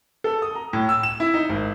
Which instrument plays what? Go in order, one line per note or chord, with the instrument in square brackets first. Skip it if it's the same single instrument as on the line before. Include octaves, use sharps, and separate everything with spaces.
[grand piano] A4
D#6
A#5
A2
E6
E7
E4
D#4
G#1